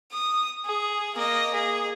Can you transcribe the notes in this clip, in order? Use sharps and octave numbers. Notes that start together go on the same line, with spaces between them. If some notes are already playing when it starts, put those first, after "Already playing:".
D#6
G#4
A#3 D#5
G#4